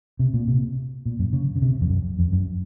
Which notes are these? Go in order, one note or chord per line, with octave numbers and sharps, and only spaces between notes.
C3
A#2
C3
A#2
F#2
C#3
C#3
C3
F2
F#2
F2
F#2